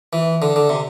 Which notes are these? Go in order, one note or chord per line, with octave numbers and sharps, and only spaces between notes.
E3
D3
D3
C3